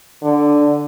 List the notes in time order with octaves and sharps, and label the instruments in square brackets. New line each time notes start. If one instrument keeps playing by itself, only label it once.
[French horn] D3